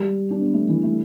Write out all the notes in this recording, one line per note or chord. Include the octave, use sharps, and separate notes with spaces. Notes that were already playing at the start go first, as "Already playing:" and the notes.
Already playing: G3
D4
B3
A3
E3
A3